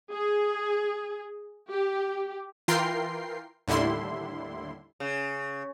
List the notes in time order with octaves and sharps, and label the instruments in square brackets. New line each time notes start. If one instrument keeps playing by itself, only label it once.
[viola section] G#4
G4
[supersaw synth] E3 F4 A#4 G5 C6 C7
D#2 A2 D3 G3 E4 C6
[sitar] C#3